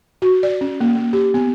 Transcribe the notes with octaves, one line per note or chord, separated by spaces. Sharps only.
F#4
D5
C#4
A#3
A#3
G4
B3